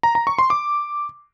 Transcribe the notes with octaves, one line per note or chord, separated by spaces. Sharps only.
A#5
A#5
C#6
C6
D6